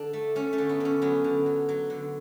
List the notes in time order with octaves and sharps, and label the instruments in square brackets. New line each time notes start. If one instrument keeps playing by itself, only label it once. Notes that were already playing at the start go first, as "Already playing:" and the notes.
Already playing: [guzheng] D3 D4
A3
A3 C#4
A3
D3
B3
D3 C#4
F#3 B3
D3
F#3
F#3
D3